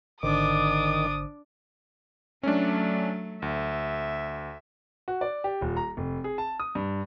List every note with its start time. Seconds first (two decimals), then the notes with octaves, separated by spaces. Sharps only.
0.23 G#1 D3 D#3 D4 C5 D6 D#6
2.43 F#3 A3 C#4 D4
3.42 D2 E5
5.08 F#4
5.21 D5
5.44 G4
5.61 D#1
5.77 A#5
5.97 F1
6.24 G#4
6.38 A5
6.60 D#6
6.75 G2